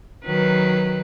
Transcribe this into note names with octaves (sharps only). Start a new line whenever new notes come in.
D#3 F#3 B4